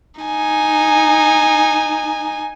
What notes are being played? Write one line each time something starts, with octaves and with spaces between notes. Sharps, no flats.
D#4 G#5